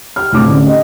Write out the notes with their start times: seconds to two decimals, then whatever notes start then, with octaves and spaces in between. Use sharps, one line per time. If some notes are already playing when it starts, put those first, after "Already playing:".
0.16 G4 F6
0.32 D2 A2 C4 D4 D6
0.47 D3 C#4
0.67 G4 D#5